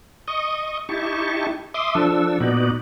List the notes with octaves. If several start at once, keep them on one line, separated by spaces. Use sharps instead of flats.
D#5 C#6 D#6
D#4 E4 G4 A5 C#6
E5 C6 D6 D#6
F3 D4 A4 E6
A#2 B3 D#4 F#4 D5